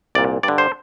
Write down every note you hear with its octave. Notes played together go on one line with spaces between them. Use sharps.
C2 A#2 D5
G2 D3 D5
C5